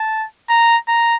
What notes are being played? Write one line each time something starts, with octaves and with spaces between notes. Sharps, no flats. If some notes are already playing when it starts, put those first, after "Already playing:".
Already playing: A5
A#5
A#5